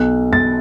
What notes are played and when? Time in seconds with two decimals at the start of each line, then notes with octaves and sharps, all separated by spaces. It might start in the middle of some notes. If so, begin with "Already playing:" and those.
Already playing: B1 F#6
0.32 B1 A6